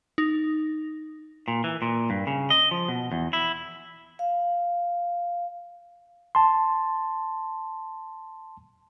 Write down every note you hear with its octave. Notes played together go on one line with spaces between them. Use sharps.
D#4
A#2
E3
A#2
G2
C#3
D#5
F3
B2
E2
E4
F5
A5 C6